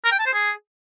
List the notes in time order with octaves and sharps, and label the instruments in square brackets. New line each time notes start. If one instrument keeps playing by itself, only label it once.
[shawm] A#4
G5
A5
C5
G#4